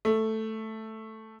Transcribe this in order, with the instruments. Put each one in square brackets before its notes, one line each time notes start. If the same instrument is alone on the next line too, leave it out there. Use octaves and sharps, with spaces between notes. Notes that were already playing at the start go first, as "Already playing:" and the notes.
[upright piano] A3